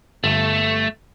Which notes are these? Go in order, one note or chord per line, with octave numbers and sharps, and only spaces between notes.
G1 A3